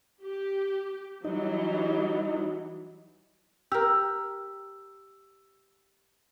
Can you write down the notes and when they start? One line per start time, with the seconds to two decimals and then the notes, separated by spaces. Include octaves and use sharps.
0.24 G4
1.25 E3 F#3 G3 D#4
3.72 G4 A#4 E6